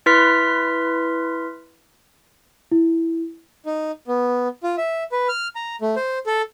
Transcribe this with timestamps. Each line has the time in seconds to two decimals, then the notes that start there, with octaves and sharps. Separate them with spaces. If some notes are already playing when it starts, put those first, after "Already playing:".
0.06 E4 B4 C6 F6 B6
2.71 E4
3.66 D#4
4.08 B3
4.64 F4
4.77 E5
5.12 B4
5.28 F6
5.56 A#5
5.81 A3
5.96 C5
6.26 A4